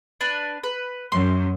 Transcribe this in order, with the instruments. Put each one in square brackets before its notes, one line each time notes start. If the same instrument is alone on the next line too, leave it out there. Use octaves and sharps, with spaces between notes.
[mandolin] D4 B4
B4
[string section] F#2 [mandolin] C6